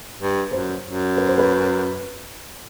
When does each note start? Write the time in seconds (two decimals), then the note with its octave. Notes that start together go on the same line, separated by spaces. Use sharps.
0.20 G2
0.51 F#2 C5
0.84 F#2
1.17 B4
1.27 C5
1.38 B4